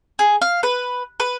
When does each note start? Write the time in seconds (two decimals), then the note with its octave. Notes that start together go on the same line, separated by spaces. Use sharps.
0.19 G#4
0.42 F5
0.63 B4
1.20 B4